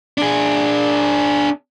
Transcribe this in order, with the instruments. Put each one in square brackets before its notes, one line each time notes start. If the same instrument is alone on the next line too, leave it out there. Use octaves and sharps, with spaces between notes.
[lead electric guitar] D4 G#4